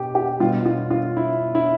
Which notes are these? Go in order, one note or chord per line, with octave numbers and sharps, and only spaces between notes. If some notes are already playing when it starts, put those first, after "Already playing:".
Already playing: B2 G4
G4
B2 G3 F4
F4
F4
E4
E4